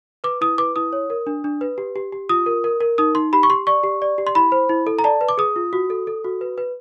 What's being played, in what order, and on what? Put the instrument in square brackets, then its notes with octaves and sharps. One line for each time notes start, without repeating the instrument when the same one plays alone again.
[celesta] B4 D6
E4 D#6
B4 D6
E4 D#6
C#5
A#4
D4
D4
B4
G4
G4
G4
F4 D#6
A#4
A#4
A#4
D#4 D#6
D#4 C6
G4 B5
C#6
G4 C6
D5 C#6
G4
D5
G4
C6
E4 B5
C5
E4
A4
A#5
D5 A5
B4
D6
G#4 D#6
F4
F#4
A4
A4
F#4
B4
B4